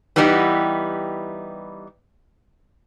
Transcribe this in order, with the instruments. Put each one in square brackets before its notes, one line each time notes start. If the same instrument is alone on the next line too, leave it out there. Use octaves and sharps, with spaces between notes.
[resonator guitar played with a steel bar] E3 G3 B3 D#4 E4 G4